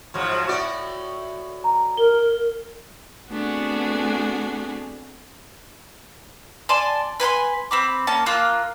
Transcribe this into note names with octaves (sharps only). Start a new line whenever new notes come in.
G#2 F3 F#3
A2 F#4 D5
A#5
A#4 G7
A3 B3 C4 D4 F#4 G#4
D5 G#5 A5 C6
B4 G#5 B5 C6
C4 B5 D6
A#3 C#4 A5
A#3 F4 E6 F#6